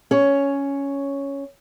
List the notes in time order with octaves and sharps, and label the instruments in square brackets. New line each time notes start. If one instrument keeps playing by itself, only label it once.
[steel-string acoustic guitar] C#4 C#5